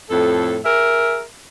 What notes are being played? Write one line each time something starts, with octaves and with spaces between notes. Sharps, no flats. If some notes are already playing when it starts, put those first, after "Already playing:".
F2 A2 A4
G#4 A#4 E5